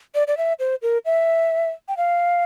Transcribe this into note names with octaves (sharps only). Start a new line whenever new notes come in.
D5
D5
E5
C5
A#4
E5
G5
F5